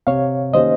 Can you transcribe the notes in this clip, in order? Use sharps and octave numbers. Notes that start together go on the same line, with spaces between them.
C3 C#5 F5
D#3 A#3 C#4 G4 C5 D#5